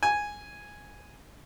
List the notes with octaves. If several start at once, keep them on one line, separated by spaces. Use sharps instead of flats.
G#5